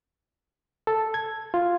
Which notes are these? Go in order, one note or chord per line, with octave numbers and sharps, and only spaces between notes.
A4
G#6
F4